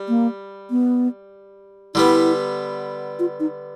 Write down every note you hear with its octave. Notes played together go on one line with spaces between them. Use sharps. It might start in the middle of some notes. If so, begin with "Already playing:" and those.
Already playing: G3
A#3
B3
D3 G3 B3 E4
F4
D#4